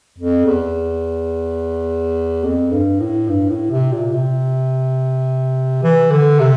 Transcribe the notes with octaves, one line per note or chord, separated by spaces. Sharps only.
F2
E2
F2
G2
A2
G2
A2
C3
A#2
C3
E3
D3
C3